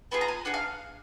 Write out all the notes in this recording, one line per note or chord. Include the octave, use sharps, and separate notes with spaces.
B3 F4 G#4 B5
A#5
G#5
D4 G#4 F#5
F5